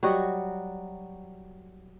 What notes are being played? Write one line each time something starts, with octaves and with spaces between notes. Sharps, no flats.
F#3 G3 F#4 D#5